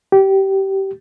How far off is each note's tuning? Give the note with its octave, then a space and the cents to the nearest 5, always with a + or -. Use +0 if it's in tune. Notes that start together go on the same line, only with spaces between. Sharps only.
G4 -20